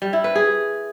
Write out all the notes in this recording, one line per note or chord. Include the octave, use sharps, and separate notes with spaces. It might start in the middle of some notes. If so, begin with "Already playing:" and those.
G3
E4
B4
G#4